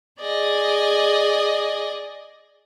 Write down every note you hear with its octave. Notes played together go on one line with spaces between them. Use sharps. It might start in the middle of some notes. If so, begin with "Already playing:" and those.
G#4 D5 D#5 G#5